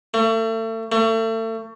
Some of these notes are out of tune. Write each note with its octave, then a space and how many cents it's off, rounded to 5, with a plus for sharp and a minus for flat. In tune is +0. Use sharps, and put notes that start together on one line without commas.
A3 +35
A3 +35